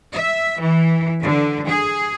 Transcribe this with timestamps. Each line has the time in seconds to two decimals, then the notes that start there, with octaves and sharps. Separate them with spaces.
0.15 E5
0.61 E3
1.23 D3
1.67 G#4